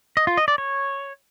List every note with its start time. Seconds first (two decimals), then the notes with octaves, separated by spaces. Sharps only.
0.17 D#5
0.27 F4
0.37 D#5
0.48 D5
0.58 C#5